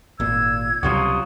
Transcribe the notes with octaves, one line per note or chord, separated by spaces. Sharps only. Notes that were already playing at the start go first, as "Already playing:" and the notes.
G#1 A#2 E6 G#6
C#2 C3 F#3 G3 F4 F#4 D#6